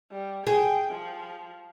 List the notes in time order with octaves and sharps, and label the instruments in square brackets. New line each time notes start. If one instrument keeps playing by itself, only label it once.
[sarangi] G3
[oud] G#4 [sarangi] G5
[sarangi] F3